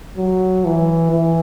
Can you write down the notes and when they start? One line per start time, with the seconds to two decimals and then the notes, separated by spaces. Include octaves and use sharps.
0.17 F#3
0.65 E3
1.11 E3